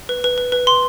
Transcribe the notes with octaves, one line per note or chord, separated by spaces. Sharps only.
B4
B4
B4
B4
C6